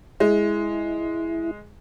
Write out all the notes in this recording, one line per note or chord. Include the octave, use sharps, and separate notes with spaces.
G#3 E4